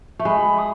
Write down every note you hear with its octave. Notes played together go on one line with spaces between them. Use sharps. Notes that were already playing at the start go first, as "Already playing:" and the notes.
A3
G#3 B5
D#6